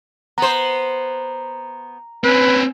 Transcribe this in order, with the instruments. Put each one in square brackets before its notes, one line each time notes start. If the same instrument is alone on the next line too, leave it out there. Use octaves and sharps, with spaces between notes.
[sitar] B3 C5 [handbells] A#5
[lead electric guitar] C4 C#4 [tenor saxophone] B4